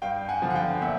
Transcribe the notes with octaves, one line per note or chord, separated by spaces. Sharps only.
G2 F5 G5
F#5 G#5
D3 F3
F#5
F5 G5
A#2 E5 F#5